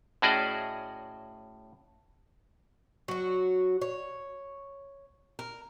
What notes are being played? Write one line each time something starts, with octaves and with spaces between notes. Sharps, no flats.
A2 C#4 F#4 G#4 D5 D#5
F#3 F#4
C#5
A#4